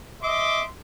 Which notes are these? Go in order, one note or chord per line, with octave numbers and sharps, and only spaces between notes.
D#5 E5 C6 D6